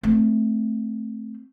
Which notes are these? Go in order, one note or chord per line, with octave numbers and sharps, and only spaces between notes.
A3 C4